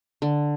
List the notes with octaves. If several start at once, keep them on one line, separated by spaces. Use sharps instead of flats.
D3